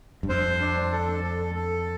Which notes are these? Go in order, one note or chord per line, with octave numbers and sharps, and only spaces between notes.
G2
F2 C5
D4
A4
A4
A4